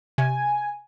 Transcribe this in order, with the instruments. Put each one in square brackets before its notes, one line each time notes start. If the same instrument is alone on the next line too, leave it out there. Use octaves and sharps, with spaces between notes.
[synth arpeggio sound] C3 [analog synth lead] G#5